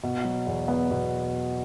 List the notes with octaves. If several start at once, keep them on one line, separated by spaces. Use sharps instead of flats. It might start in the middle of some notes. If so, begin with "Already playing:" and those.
B2
F#3
E2
B3
B2